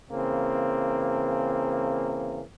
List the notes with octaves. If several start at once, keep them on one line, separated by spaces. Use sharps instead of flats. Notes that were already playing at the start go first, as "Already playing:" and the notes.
C#3 E3 A#3 C4